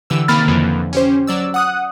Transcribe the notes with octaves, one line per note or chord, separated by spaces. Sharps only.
D3 E3 G4 E6
C3 D#3 A#3 B5 F6 A6
F2 D3 E3 F3
C#4 G4 C5
F#3 D5 E6
F#5 D#6 F#6